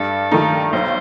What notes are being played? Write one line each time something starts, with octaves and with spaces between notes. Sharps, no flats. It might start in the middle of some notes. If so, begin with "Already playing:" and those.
Already playing: G2 A4
D#3 A3 D#4
B1 C5